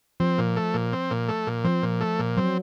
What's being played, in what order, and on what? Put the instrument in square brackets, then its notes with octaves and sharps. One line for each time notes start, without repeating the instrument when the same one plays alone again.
[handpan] F3 [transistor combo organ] C4
[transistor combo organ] A#2
A3
A#2
C4
A#2
A3
A#2
[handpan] F3 [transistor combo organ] C4
[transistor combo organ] A#2
A3
A#2
[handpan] F#3 [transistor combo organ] C4